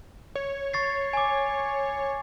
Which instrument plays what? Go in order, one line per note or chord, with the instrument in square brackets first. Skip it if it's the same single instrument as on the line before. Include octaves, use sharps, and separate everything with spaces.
[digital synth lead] C#5
[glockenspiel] C#6 A6 C7
G#5 D6